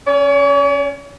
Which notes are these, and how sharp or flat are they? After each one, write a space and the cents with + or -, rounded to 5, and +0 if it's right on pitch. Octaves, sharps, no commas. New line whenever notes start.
C#4 +0 C#5 +45